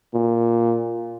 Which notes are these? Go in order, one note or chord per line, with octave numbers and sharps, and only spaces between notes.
A#2